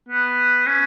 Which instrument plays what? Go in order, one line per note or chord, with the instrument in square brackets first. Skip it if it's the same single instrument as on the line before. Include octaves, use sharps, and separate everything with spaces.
[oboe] B3
C#4